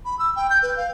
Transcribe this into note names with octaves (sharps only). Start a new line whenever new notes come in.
B5
E6
G5
G6
B4
F5